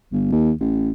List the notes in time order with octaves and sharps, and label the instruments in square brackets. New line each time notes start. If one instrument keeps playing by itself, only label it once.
[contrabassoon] G1
D#2
A1